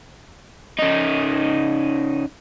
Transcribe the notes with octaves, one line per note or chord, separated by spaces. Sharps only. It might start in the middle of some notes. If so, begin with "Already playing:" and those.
C#3 D#4